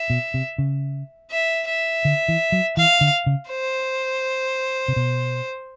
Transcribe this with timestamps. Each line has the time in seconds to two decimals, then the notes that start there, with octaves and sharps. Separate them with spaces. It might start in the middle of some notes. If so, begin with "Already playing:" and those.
Already playing: E5
0.10 B2
0.34 C3
0.58 C#3
1.31 E5
1.68 E5
2.05 D3
2.28 E3
2.52 F#3
2.77 E3 F5
3.01 D3
3.26 C#3
3.50 C5
4.88 C3
4.96 B2